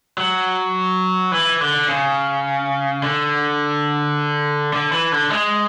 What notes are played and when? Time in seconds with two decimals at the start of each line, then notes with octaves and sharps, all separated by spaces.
0.18 F#3
1.32 E3
1.61 D3
1.88 C#3
3.03 D3
4.73 D3
4.92 E3
5.12 D3
5.30 G#3